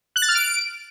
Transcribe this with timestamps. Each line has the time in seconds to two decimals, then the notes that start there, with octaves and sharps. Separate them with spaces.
0.16 F#6
0.22 A6
0.29 F6
0.35 D7